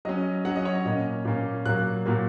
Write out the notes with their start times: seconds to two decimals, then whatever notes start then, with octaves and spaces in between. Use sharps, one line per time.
0.05 F#3 C#4 D#5
0.45 F#3 C#4 F#5
0.56 D#5
0.65 C#5
0.75 D#5
0.85 A#2 A#3 C#4
1.25 A#2 A#3 C#4
1.66 A#2 F#3 A#3 F#6
2.06 A#2 F#3 A#3